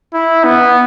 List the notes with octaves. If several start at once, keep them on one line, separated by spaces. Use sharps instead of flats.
E4
B3